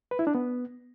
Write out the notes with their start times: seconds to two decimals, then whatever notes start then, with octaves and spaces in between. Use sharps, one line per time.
0.11 B4
0.19 E4
0.27 D4
0.35 B3